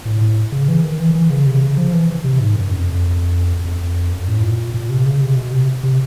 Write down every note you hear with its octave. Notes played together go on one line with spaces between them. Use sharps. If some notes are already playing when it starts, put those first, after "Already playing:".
A2
A2
C#3
E3
D#3
E3
E3
C#3
C3
C#3
F3
E3
C3
G#2
F#2
F2
F2
F#2
A2
A#2
A#2
C3
C#3
C3
B2
C3
C3